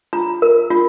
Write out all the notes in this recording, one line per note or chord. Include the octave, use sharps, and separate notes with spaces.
F4 A#5
A#4
F4